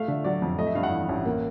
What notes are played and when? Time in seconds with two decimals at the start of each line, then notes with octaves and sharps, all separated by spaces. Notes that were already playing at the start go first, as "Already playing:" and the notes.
Already playing: A3 F5
0.08 D3 E5
0.24 F#3 D5
0.42 F2
0.58 A3 D#5
0.67 E5
0.75 G2 F5
0.83 F#5
0.92 E3
1.09 A1
1.26 A#3